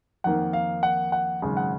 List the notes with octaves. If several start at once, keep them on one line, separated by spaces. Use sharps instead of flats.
F2 D#3 A#3 F#5
F5
F#5
F#5
G#1 F#2 C#3 G#3
F#5